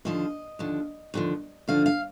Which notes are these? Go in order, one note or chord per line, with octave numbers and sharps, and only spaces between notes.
D#2 D3 F3 D#5
D#2 D3 F3
D#2 D3 F3
D#2 D3 F3 F5
F5